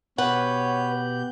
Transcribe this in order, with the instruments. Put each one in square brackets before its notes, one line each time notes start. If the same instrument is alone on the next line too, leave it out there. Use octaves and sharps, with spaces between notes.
[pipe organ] B2 G4 G6 [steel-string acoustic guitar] B4 [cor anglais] C#5 [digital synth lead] F#5